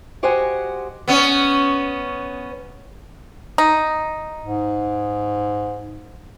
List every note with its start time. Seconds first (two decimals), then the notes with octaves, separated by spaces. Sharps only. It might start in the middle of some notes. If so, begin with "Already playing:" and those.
0.23 F#4 G4 C5 D#5 F#5 G#5
1.08 B3 C#4
3.58 D#4
4.43 G#2